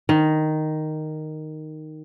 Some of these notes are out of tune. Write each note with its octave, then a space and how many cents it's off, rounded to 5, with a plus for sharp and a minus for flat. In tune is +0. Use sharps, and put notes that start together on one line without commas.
D#3 -5